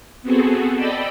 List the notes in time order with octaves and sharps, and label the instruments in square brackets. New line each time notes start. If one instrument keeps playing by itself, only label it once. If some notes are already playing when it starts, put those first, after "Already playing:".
[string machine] B3 C4 F#4 G#4 A4
A4 D5 D#5 G5 B5 E6